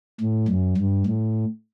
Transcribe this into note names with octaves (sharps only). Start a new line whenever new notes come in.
A2
F#2
G2
A2